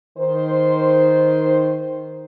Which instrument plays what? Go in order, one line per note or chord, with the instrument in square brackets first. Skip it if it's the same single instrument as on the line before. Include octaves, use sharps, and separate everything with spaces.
[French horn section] D#3 C5